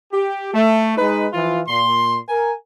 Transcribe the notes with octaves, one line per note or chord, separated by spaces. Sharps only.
G4
A3
G#3 D#4 B4
E3 F3 F4
A#2 C6
A#4 G#5